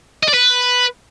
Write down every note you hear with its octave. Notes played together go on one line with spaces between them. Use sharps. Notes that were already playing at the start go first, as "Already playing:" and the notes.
D#5
D5
B4